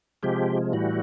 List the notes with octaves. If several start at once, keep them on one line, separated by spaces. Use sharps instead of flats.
C3 F3 G#3 G4
A2 E3 G3 F#4